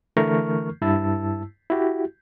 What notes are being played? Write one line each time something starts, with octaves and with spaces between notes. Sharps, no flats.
D3 E3 A3 A#4 C#6 F6
G2 E4 A5 E6
E4 F#4 G4